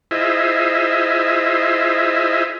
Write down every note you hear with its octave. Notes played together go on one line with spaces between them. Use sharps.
E4 F4 G#4 C5 D#5 E5